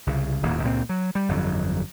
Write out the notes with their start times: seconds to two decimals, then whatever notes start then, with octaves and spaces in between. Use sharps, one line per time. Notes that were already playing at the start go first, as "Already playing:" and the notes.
0.07 C2 C#3
0.43 D#1 D#2 A2 A#3
0.63 C#2 A#2 F#3 C4
0.89 F#3
1.15 G3
1.29 G1 F2 F#3